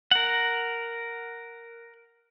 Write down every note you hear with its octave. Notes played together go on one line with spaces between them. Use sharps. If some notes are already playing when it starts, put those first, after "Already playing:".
A#4 F#5